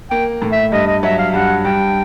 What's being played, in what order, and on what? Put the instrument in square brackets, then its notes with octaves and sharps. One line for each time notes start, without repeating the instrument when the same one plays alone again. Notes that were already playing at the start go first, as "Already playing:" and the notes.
[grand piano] A#3 [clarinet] G5
[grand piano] A2
[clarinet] E5
[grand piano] G2 [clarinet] D#5
[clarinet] D#5
[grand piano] F#3 [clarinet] E5
[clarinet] F5
[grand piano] G2 [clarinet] F#5
[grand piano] G2 [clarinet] G5